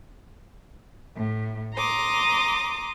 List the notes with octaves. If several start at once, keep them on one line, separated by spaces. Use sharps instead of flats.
A2
A#5 C6 D6 D#6